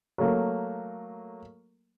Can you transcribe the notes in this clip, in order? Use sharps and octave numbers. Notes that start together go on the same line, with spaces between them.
F#3 A3 A#3